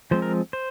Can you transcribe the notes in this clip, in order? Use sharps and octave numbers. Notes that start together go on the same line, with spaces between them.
F3 G#3 C4 C5
A#4
C5